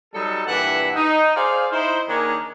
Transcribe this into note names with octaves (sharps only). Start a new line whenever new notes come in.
F#3 G3 D#4 A4
G2 A#2 E3 D4 E5 F#5
D#4
G#4 C5 D5 F5
D#4 E4 C5
D#3 A#3 D4 D#4 G#4 C#5